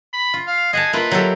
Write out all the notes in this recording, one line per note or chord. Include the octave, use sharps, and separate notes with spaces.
B5
F4
F5
G#4 D#5 F#5 A5
A#3 E4 F4 B4
F#3 G4 A4